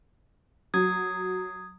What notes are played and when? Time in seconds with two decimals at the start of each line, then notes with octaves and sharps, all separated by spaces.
0.74 F#3 D#6 G#6